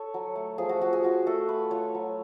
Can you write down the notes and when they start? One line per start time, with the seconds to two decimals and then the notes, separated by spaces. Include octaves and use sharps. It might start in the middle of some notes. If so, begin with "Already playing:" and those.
Already playing: A4 C#5
0.14 F#3
0.36 A3
0.58 F3 G#4
0.69 F#4
0.81 F3 F#4
0.93 G#4
1.03 F4 F#4
1.27 A3 A4
1.49 A3 B4
1.71 F4 C#5
1.94 F#3